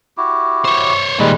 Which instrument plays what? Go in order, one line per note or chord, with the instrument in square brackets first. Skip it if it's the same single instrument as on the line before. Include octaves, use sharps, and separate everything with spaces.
[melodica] E4 F#4 G4
[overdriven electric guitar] C5 C#5
[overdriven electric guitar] A#2 D#3 [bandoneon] G3 G#3 [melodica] B4 B5